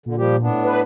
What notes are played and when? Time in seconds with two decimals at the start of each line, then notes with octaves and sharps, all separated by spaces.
0.06 A#2 D3
0.18 F3 G3 G4
0.42 A2 B3 D4
0.63 B4